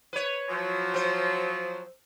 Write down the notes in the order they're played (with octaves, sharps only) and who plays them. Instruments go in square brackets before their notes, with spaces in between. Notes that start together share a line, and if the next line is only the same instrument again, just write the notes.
[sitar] B4 C#5
[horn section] F3 F#3
[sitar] C4 C5